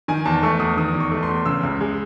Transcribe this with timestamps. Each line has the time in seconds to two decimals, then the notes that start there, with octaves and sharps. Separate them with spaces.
0.08 D#3 G#5
0.25 E2 A5
0.43 A3 C#6
0.60 E2 D#6
0.77 D#3 D#6
0.94 E2
1.00 C#6
1.11 A3
1.23 C6
1.29 E2
1.45 C#3 E6
1.63 C#2
1.81 G#3